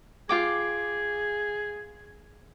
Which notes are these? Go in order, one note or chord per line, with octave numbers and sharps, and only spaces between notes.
F4 G#4 G5 D6